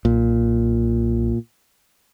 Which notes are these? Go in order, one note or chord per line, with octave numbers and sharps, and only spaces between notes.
B1 A#2